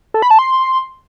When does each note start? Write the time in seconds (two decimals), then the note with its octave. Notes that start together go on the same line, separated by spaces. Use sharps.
0.14 A4
0.22 B5
0.31 A5
0.39 C6